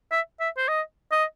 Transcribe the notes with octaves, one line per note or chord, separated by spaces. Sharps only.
E5
E5
C5
D#5
D#5